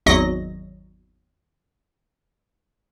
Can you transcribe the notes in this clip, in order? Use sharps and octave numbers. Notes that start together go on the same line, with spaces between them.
G#1 E2 F#3 D#5 A#6